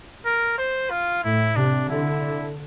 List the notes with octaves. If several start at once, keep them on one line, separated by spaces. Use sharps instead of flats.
A#4
C5
F4
A2 E4
C3 D4
D3 E4